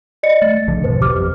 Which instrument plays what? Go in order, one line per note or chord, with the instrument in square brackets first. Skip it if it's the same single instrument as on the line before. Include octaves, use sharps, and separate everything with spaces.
[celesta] D5 D#5 C#7
[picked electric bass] A3 [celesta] A6
[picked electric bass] A#1 D3 F3
[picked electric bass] G#1 E2 B2 [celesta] B4 C5
[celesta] G4 D6 F6
[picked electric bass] F2